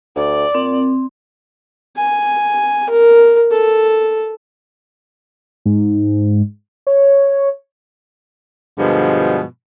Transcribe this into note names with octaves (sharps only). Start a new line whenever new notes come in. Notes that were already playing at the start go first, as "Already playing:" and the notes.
D2 D5
A#2 C4
G#5
A#4
A4
G#2
C#5
G2 B2 D3 F3 G#3